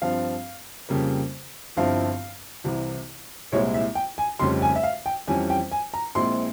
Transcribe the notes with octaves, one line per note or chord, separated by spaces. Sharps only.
G2 F3 C4 F5
F2 C#3 G3 A#3
G1 G2 F3 C4 E4 F5
C2 C3 E3
C2 A#2 G#3 C4 E4 C#5
E5
G5
G#5
F1 F2 C#3 G3 C#4 C6
G#5
E5
F5
G5
F2 E3 G3 C#4 G#5
G5
G#5
A#5
A#1 A#2 G#3 C4 E4 C6